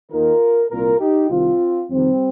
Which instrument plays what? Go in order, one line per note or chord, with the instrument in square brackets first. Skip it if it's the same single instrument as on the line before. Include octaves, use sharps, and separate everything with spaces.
[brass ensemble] D#2 D#3 F4 A#4
C2 A#2 F4 A#4
D#4 G4
C2 C3 D#3 C4 F4
F2 C3 D#3 G3 C4